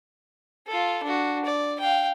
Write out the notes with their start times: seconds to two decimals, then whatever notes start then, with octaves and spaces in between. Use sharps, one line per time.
0.67 F4 A4
1.03 D4 F#4
1.45 D5
1.80 F5 G5